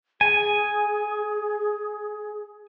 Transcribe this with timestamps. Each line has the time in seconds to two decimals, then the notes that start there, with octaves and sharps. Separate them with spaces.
0.21 G#4 G#5